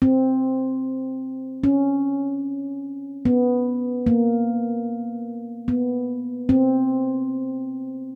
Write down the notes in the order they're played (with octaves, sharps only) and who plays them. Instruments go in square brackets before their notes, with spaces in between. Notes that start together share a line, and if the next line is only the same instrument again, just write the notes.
[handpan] C4
C#4
B3
A#3
B3
C4